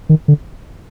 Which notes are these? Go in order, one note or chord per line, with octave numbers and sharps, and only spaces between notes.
D#3
D3